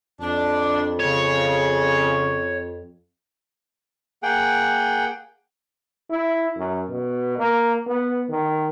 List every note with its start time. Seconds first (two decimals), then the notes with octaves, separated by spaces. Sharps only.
0.21 F2 D4
1.00 C#3 C#5
4.23 A#3 G#4 F#5 G5
6.10 E4
6.57 F#2
6.89 B2
7.38 A#3
7.86 B3
8.29 D#3